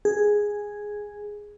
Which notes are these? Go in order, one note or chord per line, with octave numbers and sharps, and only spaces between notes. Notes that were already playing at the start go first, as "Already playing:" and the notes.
G#4